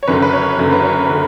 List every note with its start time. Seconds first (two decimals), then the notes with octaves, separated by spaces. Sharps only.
0.03 C#5
0.08 F#1 F#2 D3 B4
0.22 B4
0.33 C#5
0.57 F#1 F#2 D3
0.72 B4
0.83 C#5
1.07 D3 B4